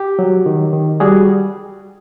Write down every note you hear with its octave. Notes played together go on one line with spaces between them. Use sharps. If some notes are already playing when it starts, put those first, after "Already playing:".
Already playing: G4
F#3
D#3
D#3
G3 F#4 G#4